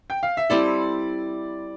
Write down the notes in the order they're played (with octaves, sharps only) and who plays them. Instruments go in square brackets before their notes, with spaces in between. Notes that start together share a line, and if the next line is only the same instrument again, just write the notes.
[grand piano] G5
F5
E5
[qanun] G3 C4 E4 A4 [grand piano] D5